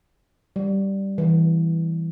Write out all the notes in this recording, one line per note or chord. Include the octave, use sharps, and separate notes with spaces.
G3
E3